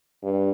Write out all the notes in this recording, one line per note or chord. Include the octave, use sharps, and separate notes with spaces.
G2